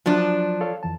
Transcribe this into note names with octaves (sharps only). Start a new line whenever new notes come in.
F3 F#3 D4 F#6
A4 C#5 F5
F2 E3 A5